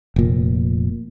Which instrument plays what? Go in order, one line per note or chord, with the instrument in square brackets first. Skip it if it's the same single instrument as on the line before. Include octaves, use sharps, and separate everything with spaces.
[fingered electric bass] F1 A#2